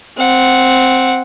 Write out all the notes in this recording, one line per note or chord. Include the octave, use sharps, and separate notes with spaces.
C4 F#5